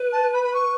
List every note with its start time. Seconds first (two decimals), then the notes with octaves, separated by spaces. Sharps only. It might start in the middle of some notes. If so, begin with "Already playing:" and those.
Already playing: B4
0.13 A5
0.34 B5
0.44 B5
0.54 C#6